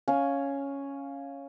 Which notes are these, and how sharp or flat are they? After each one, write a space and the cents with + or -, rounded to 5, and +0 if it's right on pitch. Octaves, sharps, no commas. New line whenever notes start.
C#4 +0 F5 +5